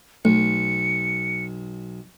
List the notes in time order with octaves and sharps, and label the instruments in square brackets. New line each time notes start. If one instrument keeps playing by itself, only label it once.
[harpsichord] B1 [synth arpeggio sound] A3 [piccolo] C#7